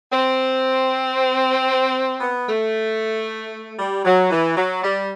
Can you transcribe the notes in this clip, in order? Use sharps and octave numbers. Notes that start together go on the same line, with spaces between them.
C4
B3
A3
G3
F#3
E3
F#3
G3